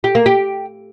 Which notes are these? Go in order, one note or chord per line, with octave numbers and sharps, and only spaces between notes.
G4
A#3
G4